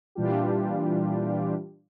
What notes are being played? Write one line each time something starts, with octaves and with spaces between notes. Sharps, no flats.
A#2 E3 G3 D4 F4 G4